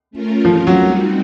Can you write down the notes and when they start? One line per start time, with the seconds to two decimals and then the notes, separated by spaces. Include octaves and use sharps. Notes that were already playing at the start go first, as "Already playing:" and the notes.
0.11 A3 C#4 F4 A#4
0.45 F3
0.56 F3
0.67 F#3
0.78 G3 C4 D#4 F#4